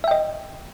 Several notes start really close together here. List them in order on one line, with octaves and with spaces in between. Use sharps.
E5 G5 D#5